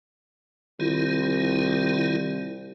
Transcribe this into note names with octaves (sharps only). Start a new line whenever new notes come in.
C2 D#3 E4 F4